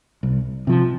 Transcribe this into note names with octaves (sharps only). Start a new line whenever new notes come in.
C2
C3 F3